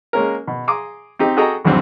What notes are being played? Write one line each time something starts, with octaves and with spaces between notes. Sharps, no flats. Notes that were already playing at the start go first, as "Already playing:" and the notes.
G#3 A#3 C#4 A#4
B2
G#4 A#5 C6 D6 D#6
C4 D#4 G4
F#4 G#4 A4 D#5 G5 A#5
B1 E2 G2 F#3 C4 C#4